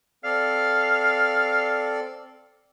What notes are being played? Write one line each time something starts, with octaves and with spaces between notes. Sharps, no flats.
C4 A4 D5 F5